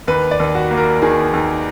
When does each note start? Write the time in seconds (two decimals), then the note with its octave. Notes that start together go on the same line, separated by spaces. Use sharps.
0.08 D#2 B4
0.31 D5
0.40 D#2
0.55 F#4
0.71 A#3
0.78 A#4
1.02 D#3 G#4
1.33 D#2